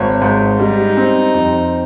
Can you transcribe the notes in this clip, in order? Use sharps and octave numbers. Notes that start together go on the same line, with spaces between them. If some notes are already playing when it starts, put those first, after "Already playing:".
Already playing: G#1 C#5
G#2
G3 D#4
C4
F2